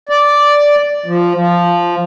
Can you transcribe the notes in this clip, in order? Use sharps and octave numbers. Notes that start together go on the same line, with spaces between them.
D5
F3
F3